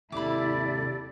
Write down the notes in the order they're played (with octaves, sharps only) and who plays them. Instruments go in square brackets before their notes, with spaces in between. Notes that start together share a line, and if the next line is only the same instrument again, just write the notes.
[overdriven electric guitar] D#2 C3 [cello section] E4 [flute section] G4 A4 D5 [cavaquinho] B5 D6